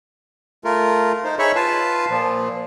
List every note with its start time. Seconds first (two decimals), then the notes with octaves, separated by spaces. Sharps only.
0.64 A3 F4 A#4
1.24 D#4 C5
1.39 D#4 G#4 C#5 E5 B5 C#6
1.55 F4 B4 F5 A5
2.09 A#2 F3